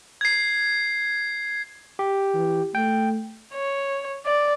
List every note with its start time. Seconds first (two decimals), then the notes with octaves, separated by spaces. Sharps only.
0.21 G#6 C7
1.99 G4
2.34 E3
2.75 A3 G5
3.54 C#5
4.26 D5